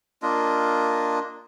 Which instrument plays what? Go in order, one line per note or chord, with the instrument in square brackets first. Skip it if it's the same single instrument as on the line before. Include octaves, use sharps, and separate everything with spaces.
[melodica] A#3 D4 F4 D#5